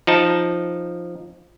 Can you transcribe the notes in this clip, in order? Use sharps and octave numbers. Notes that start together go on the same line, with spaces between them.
F3 D#4 A5